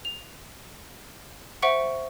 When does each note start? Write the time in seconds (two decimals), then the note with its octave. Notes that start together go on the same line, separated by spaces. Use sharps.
0.05 F7
1.62 C5 E5 F#5 C#6 D7